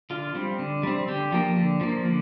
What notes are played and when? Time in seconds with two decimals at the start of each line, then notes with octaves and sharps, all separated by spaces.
0.10 D3 F4
0.35 G3 C4
0.59 D3
0.83 G3 C4
1.08 D3 G4
1.32 F3 A#3
1.56 D3
1.81 F3 A#3
2.05 D3